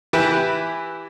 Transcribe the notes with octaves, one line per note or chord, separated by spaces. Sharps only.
E3 E4 G4 B4